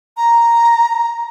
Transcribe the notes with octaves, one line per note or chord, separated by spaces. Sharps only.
A#5